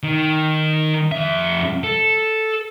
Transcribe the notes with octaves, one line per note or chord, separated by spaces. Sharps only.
D#3
F2 E5
A4